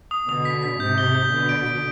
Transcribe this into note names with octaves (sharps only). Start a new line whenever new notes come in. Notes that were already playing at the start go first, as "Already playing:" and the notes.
D#6
B2 D3 D#6
B6
B6
G#2 C3 G6
G7
G6
B2 D3 G6
D7
D7